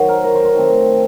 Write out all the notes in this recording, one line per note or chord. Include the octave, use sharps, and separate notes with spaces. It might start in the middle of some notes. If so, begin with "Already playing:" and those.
Already playing: D#3 F#3 F#4 C5
A#4
A#4
C5
C5
D#3 A3 C4